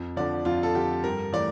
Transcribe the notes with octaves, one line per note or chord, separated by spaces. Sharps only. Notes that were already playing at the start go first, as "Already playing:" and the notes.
Already playing: F2
D3 F3 D5
F2 F4
A4
D3 F3 G4
G2 A#4
E3 A3 D5